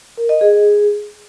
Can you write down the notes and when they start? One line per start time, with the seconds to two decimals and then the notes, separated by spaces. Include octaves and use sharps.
0.17 A#4
0.29 D#5
0.41 G#4